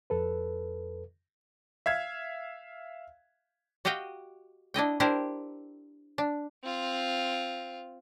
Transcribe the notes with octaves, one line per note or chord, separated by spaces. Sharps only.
F2 A4 B4
E5 F5 G#6
F#4 G4 D#5 F5 G5
D4 E4 D#5 G5
D4 E4 G4 A#4 C5
D4
C4 F4